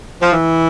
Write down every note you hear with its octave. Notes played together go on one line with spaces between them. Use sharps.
F3
E3